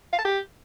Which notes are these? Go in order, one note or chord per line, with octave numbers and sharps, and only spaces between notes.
F5
A5
G4